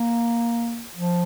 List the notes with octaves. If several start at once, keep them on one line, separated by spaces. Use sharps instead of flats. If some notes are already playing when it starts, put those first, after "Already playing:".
Already playing: A#3
F3